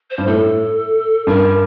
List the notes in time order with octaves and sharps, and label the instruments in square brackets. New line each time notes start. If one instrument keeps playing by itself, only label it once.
[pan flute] C5
[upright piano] G2
[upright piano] A2 [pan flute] A4
[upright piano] G2 [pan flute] A#4